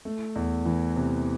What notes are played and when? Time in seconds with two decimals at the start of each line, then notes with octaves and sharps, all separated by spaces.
0.05 A3
0.36 E2
0.66 E3
0.96 C3